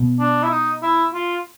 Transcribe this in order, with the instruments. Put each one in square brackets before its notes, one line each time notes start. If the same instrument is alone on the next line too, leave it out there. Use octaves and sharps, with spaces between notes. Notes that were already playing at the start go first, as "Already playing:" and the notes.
Already playing: [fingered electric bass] B2
[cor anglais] D4
E4
D#4
E4
F4